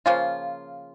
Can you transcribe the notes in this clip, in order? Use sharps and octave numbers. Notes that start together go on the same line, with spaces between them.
C#3 F3 A#3 F4